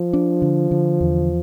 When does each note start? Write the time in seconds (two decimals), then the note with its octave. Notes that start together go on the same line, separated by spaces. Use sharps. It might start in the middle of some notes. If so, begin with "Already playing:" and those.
Already playing: F3
0.13 D4
0.42 D3
0.71 D3
1.00 E2